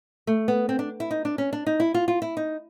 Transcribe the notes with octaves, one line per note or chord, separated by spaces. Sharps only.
A3
B3
C4
D4
E4
D#4
D4
C#4
D4
D#4
E4
F4
F4
E4
D#4